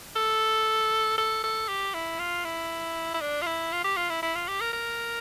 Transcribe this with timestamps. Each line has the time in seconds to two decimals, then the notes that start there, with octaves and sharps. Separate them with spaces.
0.16 A4
1.18 A4
1.43 A4
1.68 G4
1.94 E4
2.19 F4
2.45 E4
3.14 E4
3.21 D4
3.42 F4
3.46 E4
3.72 F4
3.84 G4
3.97 F4
4.10 E4
4.22 E4
4.35 F4
4.48 G4
4.61 A#4
4.73 A#4